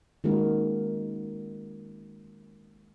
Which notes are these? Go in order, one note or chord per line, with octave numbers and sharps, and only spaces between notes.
D#3 G#3 A#3 C#4 F#4 A#4